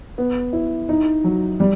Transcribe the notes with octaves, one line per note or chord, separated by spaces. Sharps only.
B3
E4
D#4
F#3
G3